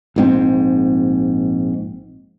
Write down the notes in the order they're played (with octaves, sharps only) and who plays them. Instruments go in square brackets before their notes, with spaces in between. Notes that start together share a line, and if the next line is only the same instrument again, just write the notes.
[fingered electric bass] A#1 G#2 C4